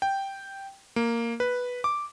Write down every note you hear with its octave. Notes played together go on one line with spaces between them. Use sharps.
G5
A#3
B4
D6